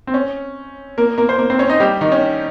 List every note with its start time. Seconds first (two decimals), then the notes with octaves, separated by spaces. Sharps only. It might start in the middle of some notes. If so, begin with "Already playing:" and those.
0.07 C4
0.14 C#4
0.98 A#3 A#4
1.18 A#3 A#4
1.29 C5
1.39 A#3 A#4
1.50 C4 C5
1.59 C#4 C#5
1.69 D#4 D#5
1.80 G3 G4
2.01 D#3 D#4
2.12 C#4